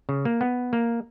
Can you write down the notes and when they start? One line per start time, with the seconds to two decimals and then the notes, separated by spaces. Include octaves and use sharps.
0.09 C#3
0.25 A#3
0.41 B3
0.73 A#3